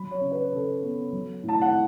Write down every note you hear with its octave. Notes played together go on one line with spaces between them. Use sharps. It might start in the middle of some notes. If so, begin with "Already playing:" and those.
Already playing: F#3 B5
C#5
C#3
B4
C#3 A4
B3
F#3
A2
A5
F#5